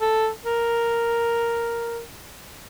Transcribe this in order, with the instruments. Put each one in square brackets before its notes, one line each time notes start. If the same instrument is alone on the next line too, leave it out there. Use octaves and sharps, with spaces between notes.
[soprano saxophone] A4
A#4